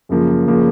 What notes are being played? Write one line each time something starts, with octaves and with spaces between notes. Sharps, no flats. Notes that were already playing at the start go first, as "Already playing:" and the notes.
F#2 C#3 F3 A#3
C#3 F3 A#3